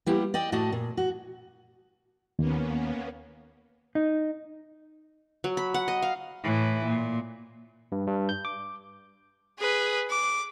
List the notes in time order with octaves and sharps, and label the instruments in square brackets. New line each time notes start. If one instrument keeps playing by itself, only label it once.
[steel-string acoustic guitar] G3 A#3 B3 E4 G4
D5 D#5 G5
A2 A3 F#4 D5 D#5 A5
A#2
F#4
[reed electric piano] D#2 [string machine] A#3 B3 C#4
[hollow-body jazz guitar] D#4
[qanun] F#3
B5
F#5
D#5
F5
[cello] A2 E3
A#2
[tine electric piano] G2
G2
G6
D6
[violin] G#4 B4
D6